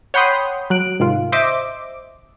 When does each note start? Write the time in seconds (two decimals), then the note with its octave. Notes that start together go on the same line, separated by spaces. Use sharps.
0.14 C#5 F#5 G5 B5 C6 D#6
0.70 F#3 F#6 D7
1.00 G#2 C3 D#3 F4
1.32 C5 D#5 E5 D6